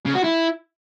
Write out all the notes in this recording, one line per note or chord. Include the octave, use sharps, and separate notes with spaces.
C#3
F#4
E4